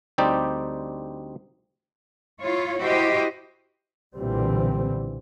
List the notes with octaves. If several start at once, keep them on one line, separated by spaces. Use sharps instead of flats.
D2 G3 C4 D#4 G4 D5
E4 F4 C#5
E4 F#4 G4 C5 D#5
B1 A#2 D3 E3 G3 C4